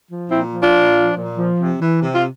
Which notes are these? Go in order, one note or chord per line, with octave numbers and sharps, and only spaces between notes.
F3
A#2 C4 E4
F3
D4 F4
A#2
F3
A#2
F3
C3
E3
C3
F4